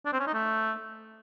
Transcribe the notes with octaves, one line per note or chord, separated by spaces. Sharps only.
D4
C4
C#4
D#4
A3